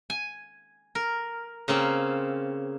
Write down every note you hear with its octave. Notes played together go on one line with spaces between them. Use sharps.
G#5
A#4
C#3 A#3 C4